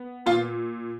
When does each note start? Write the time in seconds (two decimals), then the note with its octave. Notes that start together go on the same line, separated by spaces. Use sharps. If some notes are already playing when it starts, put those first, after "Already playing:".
Already playing: B3
0.26 A#2 F4